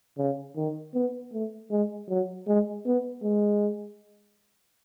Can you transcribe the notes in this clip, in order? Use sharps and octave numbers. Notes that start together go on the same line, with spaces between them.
C#3
D#3
B3
A3
G#3
F#3
G#3
B3
G#3